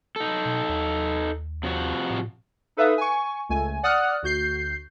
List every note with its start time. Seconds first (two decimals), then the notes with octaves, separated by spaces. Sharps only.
0.16 D#4 A4
0.45 B2
0.69 D#2
1.63 C3 F3 F#4
2.10 A2
2.77 D#4 A4 B4 E5 F5 D#6
2.98 G#5 C#6
3.49 C#2 A3 G#5
3.83 D5 F#5 D#6 F6 F#6
4.23 D2 F#4 G6 C7